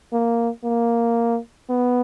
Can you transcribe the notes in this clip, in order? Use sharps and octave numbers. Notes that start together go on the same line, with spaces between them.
A#3
A#3
B3